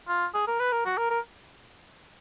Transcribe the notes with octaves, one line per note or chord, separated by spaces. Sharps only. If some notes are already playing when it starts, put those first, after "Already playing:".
F4
G#4
A#4
B4
A#4
F#4
A#4
A#4